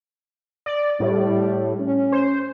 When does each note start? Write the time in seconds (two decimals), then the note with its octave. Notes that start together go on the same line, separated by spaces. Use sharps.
0.66 D5
1.00 A2 G3
1.80 C#4
2.12 C5